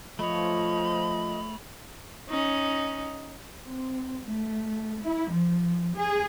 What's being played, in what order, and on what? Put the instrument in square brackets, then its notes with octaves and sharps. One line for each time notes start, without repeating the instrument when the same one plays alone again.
[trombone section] F3 [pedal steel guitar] A3 C#5 [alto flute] D#5 [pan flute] B5
[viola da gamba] C#4 D#4
[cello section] C4
A3
E4
F3
G#4